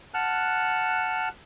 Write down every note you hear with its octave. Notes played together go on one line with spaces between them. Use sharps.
F#5 A5 F6 F#6